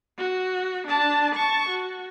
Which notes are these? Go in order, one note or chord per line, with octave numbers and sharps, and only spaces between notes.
F#4
D4 A5
A5 C#6
F#4